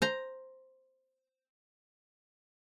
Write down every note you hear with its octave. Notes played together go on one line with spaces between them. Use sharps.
C5 A#5